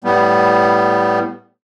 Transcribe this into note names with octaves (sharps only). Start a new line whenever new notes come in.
A2 G3 B3